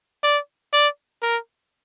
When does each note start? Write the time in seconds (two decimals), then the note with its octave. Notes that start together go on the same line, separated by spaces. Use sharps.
0.23 D5
0.73 D5
1.22 A#4